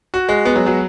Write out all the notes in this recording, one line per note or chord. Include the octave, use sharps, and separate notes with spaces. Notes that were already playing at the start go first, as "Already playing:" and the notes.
F#4
G#3
B3
F#3
F#3